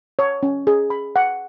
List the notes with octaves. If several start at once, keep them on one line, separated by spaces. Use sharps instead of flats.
C#5
C#4
G#4
B5
F#5